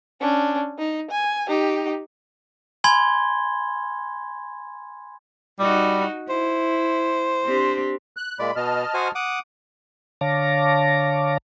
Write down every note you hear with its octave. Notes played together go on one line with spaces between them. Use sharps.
C#4 D4
D#4
G#5
D#4 G4
G#5 B5 C6 G#6 G7
G3 D#4 F#4
E4 C5
C4 D4 G4
F#6
A#2 G#3 D5 B5
B2 D#5 A5 F6
F#4 C5 G#5
F#5 D6 D#6
D3 C#5 F5 A5 D6 A#6